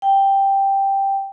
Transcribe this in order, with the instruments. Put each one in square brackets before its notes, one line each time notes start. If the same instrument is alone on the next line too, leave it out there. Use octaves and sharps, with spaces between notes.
[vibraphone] G5